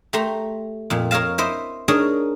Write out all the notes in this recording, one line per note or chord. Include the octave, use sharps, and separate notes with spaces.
A3 G4 A#5 C6
F2 A#2
A#4 C#5 D#5 F5 A5
E4 C5 D#5 E5
D4 D#4 G#4 A#4 C#5 D#5